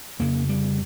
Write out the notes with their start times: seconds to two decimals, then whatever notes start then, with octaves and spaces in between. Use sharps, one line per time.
0.19 F2 C#3 A#3
0.49 G3